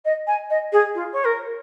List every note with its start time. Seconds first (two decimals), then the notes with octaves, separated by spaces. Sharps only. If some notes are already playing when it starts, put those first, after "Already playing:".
0.05 D#5
0.27 G#5
0.50 D#5
0.72 G#4
0.95 F4
1.12 C#5
1.25 A#4